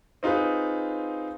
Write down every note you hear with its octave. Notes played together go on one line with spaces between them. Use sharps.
C4 D#4 F4 G#4 B4